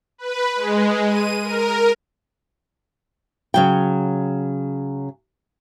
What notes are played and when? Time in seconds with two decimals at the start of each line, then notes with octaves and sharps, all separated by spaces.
0.18 B4
0.56 G#3
1.06 D#7
1.43 A#4
3.54 C#3 F#3 G5